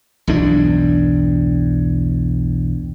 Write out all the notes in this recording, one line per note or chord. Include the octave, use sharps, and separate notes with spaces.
B1 E2 G2 D4